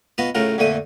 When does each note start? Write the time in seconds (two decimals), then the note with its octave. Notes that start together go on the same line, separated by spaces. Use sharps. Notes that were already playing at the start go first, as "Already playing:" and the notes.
0.18 B3 F4 F#4 B4 D#5 A5
0.35 A2 C#3 F4 A#4 F#5 A#5
0.58 F2 A#2 D3 A3 G#5 D#6